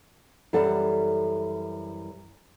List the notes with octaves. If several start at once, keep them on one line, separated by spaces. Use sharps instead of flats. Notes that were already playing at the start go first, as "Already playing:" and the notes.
F#2 E3 G3 A4 F#5